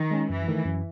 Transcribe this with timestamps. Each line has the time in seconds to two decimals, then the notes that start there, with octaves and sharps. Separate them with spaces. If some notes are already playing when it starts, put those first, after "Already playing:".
Already playing: D#3
0.11 G#3 C#4
0.30 F#2 E3
0.48 D#3 A3
0.66 F#2